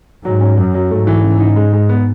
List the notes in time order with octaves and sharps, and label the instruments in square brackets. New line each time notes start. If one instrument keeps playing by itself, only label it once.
[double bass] G#2 [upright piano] F#3
[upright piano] C#4
[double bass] F#2 [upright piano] F#3
[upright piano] F#3
[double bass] G#2 [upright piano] A3
[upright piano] E3
C#3
D#4
G#3
G#3
B3